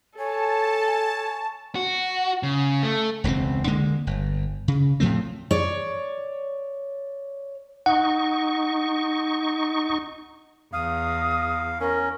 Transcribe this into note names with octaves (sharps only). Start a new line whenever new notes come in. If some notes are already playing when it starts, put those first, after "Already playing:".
A4 C#5 G#5 A5
F#4
C#3
A3
E1 C#2 D3 C4
D3 G#3 A#3
G1
C#3
A2 F3 A3 C4
C#5 D5
D#4 F#5 C#6
E2 F5 D#6
C#4 A#4